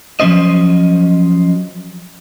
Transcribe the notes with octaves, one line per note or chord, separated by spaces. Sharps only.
F3 F#3 C#4 C5 D#5